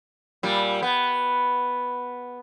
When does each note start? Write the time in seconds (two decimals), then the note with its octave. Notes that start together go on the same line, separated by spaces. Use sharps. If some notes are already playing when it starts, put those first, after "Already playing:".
0.43 A#2 G3
0.83 B3